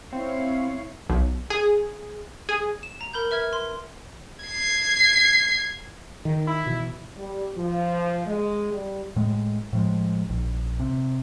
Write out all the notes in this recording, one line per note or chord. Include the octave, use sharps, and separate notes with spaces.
C4 E4 C#5 F5
B1
G#4
G#4
E7
A#5
A#4 B5 G6
B4 E5 F6 G#6
C6
G#6 C7
D#3
E4
B2 E3
G3
F3
G#3
G3
A2 G#3
A2 F3 G#3
A#1
C3